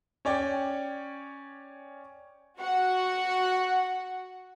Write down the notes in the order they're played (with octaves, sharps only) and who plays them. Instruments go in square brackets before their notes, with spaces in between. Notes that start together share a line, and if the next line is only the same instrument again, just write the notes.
[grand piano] C#4 C#5 D5 G5
[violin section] F#4 F#5